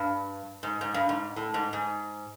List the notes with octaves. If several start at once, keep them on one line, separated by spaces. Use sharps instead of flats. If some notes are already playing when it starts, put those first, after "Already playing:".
Already playing: G2
G#2
G#2
G2
G#2
A2
G#2
G#2